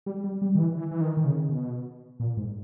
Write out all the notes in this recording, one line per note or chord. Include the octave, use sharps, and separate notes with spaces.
G3
G3
G3
D#3
E3
E3
E3
D#3
D#3
C#3
B2
A#2
G#2